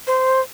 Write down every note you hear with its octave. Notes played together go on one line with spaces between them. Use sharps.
C5